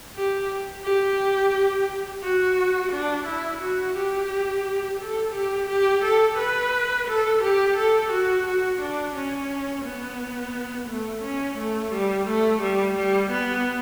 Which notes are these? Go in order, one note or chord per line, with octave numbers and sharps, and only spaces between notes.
G4
G4
F#4
D4
E4
F#4
G4
A4
G4
G4
A4
B4
A4
G4
A4
F#4
F#4
D4
C#4
B3
A3
C#4
A3
G3
A3
G3
G3
B3